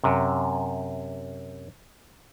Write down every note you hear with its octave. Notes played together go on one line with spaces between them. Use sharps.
F#2 C3